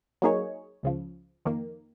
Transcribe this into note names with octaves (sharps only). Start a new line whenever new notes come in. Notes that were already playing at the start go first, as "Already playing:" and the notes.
F#3 A#3 D#4 G#4 C#5
C#2 C#3 F3
F2 D#3 A#3